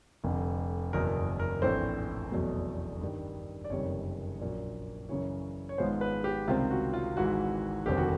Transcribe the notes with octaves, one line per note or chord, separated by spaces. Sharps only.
F1 F2 D3
F#1 E2 B2 A#4
A#4
A#1 A2 E3 A3 C4 C5
F1 E2 B2 F#3 A3
G2 D#3 G3
D5
F#1 F2 C3 D#3 G3 C#5
A#1 A#2 F#3
F#2 C#3 E3 C#5
C#5
G#1 G#2 F3 G#3 B3 C5
B4
G4
C#2 C3 D#3 G3 C4 F4
F#4
F4
G#1 G#2 E3 F#4
F1 D#2 D3 G3 C4 G4
F#4